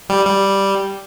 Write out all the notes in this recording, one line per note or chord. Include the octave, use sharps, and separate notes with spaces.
G3
G3